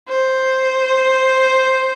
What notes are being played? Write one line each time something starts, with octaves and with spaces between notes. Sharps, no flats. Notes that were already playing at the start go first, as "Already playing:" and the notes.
C5